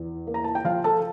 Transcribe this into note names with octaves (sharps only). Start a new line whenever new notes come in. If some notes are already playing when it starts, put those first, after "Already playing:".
Already playing: E2
A#3
A#5
A5
G5
F3 F4 F5
A4 A5